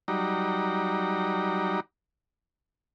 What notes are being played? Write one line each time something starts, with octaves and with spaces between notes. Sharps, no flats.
F#3 G3 D#4 D5 A#5